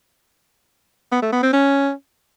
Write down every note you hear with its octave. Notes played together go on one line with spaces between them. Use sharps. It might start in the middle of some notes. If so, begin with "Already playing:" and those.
B3
A3
B3
C4
C#4